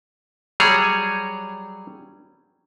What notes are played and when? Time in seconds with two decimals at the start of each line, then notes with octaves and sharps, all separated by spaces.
0.60 F#3 G3 G#4 C#5